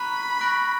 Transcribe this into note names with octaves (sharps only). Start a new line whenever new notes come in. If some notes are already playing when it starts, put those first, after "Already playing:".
Already playing: A#5 B5 C#6 F#6 B6 D#7
C#6 F#6 A#6 D7 F#7